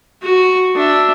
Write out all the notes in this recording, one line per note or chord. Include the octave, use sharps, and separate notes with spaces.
F#4
D4 E5